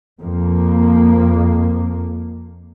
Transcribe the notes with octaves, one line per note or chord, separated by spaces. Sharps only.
F2 A#3